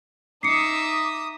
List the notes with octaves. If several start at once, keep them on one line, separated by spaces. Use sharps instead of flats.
D#4 E5 D6 D#6 C7 C#7